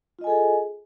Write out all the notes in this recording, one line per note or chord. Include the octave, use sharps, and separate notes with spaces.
F4 G#4 A4 D#5 G#5